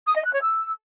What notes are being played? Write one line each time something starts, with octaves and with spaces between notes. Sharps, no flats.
D#6
D#5
F#6
C#5
E6